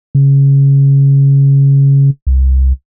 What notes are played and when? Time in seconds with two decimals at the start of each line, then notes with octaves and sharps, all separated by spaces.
0.15 C#3
2.27 C2